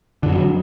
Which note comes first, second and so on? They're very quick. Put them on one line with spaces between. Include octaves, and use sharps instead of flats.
D3 F#2 F#3